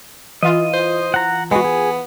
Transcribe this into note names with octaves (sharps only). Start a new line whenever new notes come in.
E3 F4 D#5
C5
F#5 A#5
G#3 B3 F#4
G#4